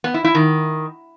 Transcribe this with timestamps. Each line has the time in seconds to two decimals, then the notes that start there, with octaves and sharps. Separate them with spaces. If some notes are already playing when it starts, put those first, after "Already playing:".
0.04 B3
0.14 E4
0.24 E4
0.35 D#3